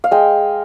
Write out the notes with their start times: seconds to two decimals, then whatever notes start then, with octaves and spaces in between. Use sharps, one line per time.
0.04 F5
0.11 G#3 G5